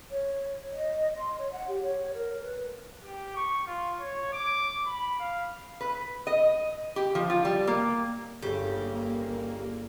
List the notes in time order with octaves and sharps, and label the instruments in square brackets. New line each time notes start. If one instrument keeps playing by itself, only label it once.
[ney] C#5
D#5
C6
C#5
F#5
G4
C#5
A#4
B4
[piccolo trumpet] G4
C#6
F4
C#5
D6
B5
F5
[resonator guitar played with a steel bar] B4
D#5
G4
F3
F4
G3
A#3
[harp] G1 [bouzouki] C#3 D#5 [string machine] A#3 [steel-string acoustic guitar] G4